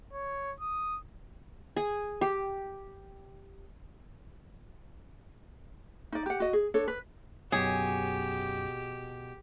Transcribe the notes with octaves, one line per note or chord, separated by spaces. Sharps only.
C#5
D#6
G#4
G4
D#4 D5
G4 F#5
F#4 D#5
G#4
D4 A4 C#5
B4
F#2 B2 G4 G#4 C#5